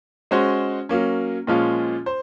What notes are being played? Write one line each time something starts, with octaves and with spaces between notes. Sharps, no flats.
G#3 C#4 F#4 C5
F#3 A#3 C#4
A#2 F3 G#3 C#4 F4
C5